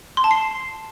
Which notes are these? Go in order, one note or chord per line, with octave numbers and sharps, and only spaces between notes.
C6
A5
C7